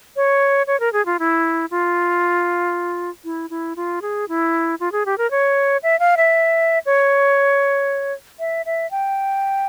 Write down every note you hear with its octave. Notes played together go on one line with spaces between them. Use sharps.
C#5
C#5
A#4
G#4
F4
E4
F4
E4
E4
F4
G#4
E4
F4
G#4
G4
A#4
C#5
E5
F5
E5
C#5
E5
E5
G5